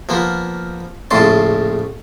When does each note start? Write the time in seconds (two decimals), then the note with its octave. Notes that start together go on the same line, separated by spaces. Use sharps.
0.09 F3 A#3 B3
1.11 A#1 A2 C#3 A5 C6